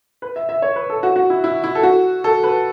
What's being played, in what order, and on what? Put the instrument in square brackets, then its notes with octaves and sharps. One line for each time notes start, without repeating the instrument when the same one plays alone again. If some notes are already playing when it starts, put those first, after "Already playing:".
[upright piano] B4
E5
E5
C#5
B4
A4
F#4
F#4
E4
E4
E4
A4
F#4
A4
B4